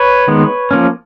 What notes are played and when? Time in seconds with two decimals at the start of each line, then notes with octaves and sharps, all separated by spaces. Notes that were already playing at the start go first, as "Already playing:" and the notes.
Already playing: B4 C#5
0.28 D#3 G#3 B3
0.71 F3 A#3 C#4